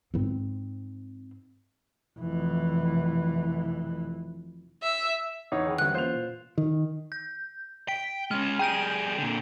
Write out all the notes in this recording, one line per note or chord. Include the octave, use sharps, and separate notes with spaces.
G#2 C4
F1 E3
E5
E2 E3 D#4 C#5
D#3 G#4 C#5 F#5 B5
C2 D3 F#5 F#6
E3 A#3 C#4 F4 C5 F7
A#2
D#3
G6
G5 B6
G#3 C#4 F6
G3 G#4 G5 G6 D7
A#2 D3